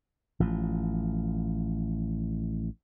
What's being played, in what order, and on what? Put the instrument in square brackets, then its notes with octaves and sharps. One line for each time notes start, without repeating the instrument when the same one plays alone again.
[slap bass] A1 F3